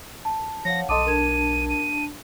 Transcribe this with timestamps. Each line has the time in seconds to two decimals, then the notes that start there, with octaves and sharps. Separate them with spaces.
0.25 A5
0.65 F3 C#5 F5 F#5 A#6
0.89 B1 A4 D#5 A5 C6 D6 D#6 D#7
1.06 D4 A#4 A5 G#6 E7
1.69 D#7